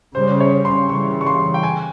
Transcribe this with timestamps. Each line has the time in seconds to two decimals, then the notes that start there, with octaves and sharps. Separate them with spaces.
0.15 C#3 G3 C#4 C5
0.40 C#5
0.65 C6
0.89 C#3 E3 G3 C#6
1.21 C#6
1.27 C6
1.54 G5
1.63 G#5